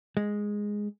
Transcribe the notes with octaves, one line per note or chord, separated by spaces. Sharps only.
G#3